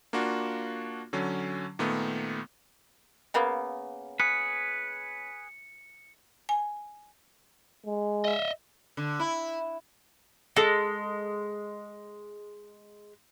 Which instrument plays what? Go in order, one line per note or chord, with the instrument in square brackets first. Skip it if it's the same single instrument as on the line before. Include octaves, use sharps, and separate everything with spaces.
[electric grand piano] A#3 D4 F4 F#4
D3 F#3 C#4
A#2 D#3 A3 B3
[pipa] C#3 A#3 B3
[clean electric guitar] G#4 B4 [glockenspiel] C#7
[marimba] G#5
[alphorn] G#3
[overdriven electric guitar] D#5 E5
[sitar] D3
E4
[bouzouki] G#3 [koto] A4